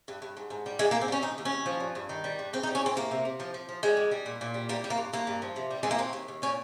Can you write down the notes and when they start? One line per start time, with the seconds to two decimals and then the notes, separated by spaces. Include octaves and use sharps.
0.08 G2
0.22 G2
0.37 G#2
0.50 G#2
0.66 G3
0.79 G#2 G#3
0.91 A#3
0.95 G#2
1.01 C4
1.08 G3 C#4
1.22 D#2 D#4
1.38 D#2
1.45 C#4
1.52 D#2
1.66 F3
1.80 G2
1.95 G2
2.09 D#3
2.24 G3
2.39 G2
2.53 G#2 C4
2.63 D#4
2.67 G3
2.75 C#4
2.81 G#2 C4
2.96 C3 A#3
3.11 C3
3.25 C3
3.40 F3
3.54 F3
3.69 F3
3.83 G3 G#3
3.97 F2
4.11 G3
4.26 A#2
4.41 A#2
4.54 G3
4.69 G3 A#3
4.84 G3
4.90 A#3
4.97 G2
5.13 G2 A#3
5.27 G2
5.42 F3
5.56 C3
5.71 G3
5.83 F2 G#3
5.91 A#3
5.98 D#2 C4
6.13 D#2
6.28 D#2
6.42 A#2 C#4